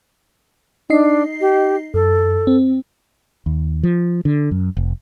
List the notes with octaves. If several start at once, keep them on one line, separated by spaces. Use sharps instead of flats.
D4 D#4 D#5 C7
G4
F#2 A4
C4
D#2
F3
D3
F#2
F1